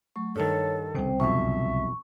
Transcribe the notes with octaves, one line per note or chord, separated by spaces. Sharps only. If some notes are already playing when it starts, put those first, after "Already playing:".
F#3 A3 C#6
G2 D#3 A4 C#5
C2 C#3 C4 C5 G5
B1 F2 E5 C#6